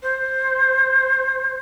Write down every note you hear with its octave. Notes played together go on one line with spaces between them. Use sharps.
C5